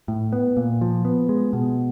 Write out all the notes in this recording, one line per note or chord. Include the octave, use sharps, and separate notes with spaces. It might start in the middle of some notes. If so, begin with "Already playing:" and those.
A2
B3
A#2
F3
B3
G#3
B2